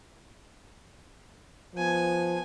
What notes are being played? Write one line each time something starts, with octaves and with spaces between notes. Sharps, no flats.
F3 B3 G#5